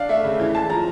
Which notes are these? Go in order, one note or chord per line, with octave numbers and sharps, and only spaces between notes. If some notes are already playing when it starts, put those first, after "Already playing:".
Already playing: D4 F5
A3 E5
C#3
E3
G#3 A5
F3 A#5